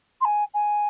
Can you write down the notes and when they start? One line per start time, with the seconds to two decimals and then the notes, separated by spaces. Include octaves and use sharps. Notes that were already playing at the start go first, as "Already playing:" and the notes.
0.21 C6
0.25 G#5
0.54 G#5